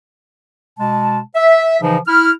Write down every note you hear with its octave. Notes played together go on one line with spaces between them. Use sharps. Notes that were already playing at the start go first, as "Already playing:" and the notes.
B2 G#3 A5
E5
C#3 E3 F3 D#4
E4 F6